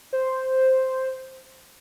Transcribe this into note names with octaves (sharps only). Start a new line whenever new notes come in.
C5